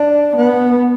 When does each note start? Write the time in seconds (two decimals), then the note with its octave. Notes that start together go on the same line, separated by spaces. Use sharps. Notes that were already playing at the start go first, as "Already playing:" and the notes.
Already playing: D4
0.36 B3